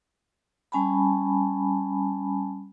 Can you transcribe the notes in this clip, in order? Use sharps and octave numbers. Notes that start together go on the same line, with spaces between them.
G3 C#4 G#5 A5 B5